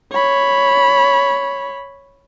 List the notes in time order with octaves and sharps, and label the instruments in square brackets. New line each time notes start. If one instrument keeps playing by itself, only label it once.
[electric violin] C#5 B5